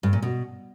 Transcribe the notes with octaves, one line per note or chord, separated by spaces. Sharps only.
G2
A#2
B2